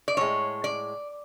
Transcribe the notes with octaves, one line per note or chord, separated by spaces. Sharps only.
D5
A2 G#3 C#5
D5